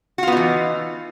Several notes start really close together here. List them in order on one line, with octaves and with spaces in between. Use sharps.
F#4 F4 B3 D#4 E3